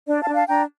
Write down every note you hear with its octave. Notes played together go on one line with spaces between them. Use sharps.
D4 D5
F5 A5
D4
F5 A5
D4 G5 A#5